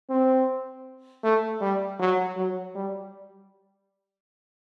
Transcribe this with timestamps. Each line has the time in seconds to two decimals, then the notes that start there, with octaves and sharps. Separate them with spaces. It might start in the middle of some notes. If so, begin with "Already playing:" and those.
0.10 C4
1.24 A3
1.61 G3
1.99 F#3
2.37 F#3
2.75 G3